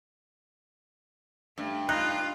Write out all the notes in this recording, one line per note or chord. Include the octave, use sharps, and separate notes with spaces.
G2 A3
G2 D#4 F4 F#6